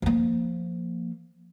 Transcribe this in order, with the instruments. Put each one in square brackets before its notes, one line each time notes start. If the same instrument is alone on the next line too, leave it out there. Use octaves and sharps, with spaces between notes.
[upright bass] F3 A#3